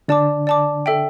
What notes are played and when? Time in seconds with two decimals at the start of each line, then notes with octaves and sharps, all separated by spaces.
0.08 D3 D4 D5 A5 D6
0.47 D5 A5 D6
0.86 A4 E5 G5